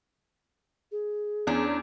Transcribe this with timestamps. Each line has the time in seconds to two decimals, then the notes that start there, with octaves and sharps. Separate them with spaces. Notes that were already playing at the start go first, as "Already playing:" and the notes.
0.92 G#4
1.47 E2 C#4 D4